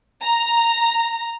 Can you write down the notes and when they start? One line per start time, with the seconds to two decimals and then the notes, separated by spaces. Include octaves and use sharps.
0.22 A#5